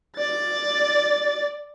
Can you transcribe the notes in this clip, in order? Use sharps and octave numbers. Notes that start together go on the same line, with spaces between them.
D5 A6